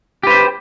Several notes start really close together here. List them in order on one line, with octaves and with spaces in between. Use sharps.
G4 B4 C5